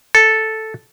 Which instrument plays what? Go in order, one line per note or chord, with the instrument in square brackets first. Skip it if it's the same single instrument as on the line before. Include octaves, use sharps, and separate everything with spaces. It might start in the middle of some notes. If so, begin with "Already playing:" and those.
[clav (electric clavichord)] A4